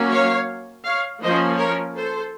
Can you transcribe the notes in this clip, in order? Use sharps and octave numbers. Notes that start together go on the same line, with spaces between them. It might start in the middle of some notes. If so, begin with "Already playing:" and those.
Already playing: F#3 A#3 C#4
C#5 F5
C#5 F5
F3 A#3 C#4 C5 D#5
A#4 C#5
A4 C5